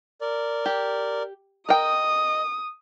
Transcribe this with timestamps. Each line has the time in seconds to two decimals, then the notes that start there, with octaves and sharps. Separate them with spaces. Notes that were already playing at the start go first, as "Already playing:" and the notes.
0.21 A#4 D5
0.66 G4
1.69 A#4 D#5 G5 D#6